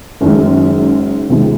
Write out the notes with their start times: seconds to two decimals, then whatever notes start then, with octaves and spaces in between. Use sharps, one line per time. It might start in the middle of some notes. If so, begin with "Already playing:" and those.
0.21 F#1 F#2 D#3 G#3
1.30 C#2 C3 D#3 G#3